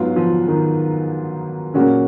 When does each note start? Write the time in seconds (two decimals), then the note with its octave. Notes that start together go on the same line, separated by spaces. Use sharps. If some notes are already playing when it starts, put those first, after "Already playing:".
Already playing: G#2 F#3 B3 F4
0.16 F3
0.48 D#3
1.74 A#2 C#3 F#3 C#4 F#4 A#4